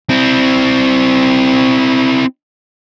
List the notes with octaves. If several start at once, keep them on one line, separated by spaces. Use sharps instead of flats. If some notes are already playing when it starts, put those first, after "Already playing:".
C4 E4